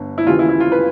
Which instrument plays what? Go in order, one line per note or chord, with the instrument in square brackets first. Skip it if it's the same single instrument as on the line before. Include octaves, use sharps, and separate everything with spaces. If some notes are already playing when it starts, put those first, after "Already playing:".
Already playing: [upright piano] G1 D3
E4
D#2 C#3 E3 F4
E4
E4
F4
B4